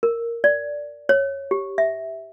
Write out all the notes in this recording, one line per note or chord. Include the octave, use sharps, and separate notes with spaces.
A#4
D5
C#5
G4
E5